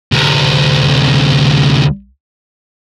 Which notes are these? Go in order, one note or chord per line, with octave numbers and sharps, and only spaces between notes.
D2 C3